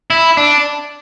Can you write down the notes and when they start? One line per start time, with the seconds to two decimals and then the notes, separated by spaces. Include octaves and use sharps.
0.10 E4
0.37 D4